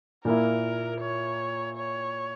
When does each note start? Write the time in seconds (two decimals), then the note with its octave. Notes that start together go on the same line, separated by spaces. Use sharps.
0.25 A#2 A#3 E4 A#4
1.01 C#5
1.77 C#5